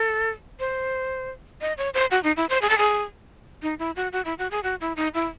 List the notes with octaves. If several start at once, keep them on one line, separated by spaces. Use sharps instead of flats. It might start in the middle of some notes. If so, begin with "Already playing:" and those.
Already playing: A4
C5
D#5
C#5
C5
F#4
D#4
E4
C5
G#4
A4
G#4
D#4
E4
F#4
F#4
E4
F#4
G#4
F#4
E4
D#4
E4